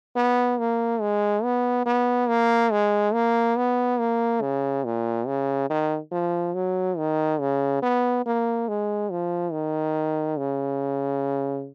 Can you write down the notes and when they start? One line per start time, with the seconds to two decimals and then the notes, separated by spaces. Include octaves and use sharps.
0.16 B3
0.59 A#3
1.01 G#3
1.43 B3
1.86 B3
2.29 A#3
2.72 G#3
3.13 A#3
3.57 B3
4.00 A#3
4.41 C#3
4.85 A#2
5.27 C#3
5.70 D#3
6.11 F3
6.54 F#3
6.98 D#3
7.40 C#3
7.82 B3
8.26 A#3
8.68 G#3
9.10 F3
9.52 D#3
10.38 C#3